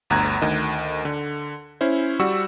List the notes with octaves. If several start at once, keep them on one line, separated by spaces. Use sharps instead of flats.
G1 D2 A#5 F#6 G#6
D2 D#3 D#5
D3
C#4 E4 C5
G3 F#4 C#6 E6